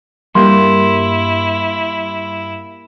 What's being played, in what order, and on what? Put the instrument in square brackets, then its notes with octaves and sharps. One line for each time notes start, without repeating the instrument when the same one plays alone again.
[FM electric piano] G2 [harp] A#3 G4 [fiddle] E4 [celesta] C6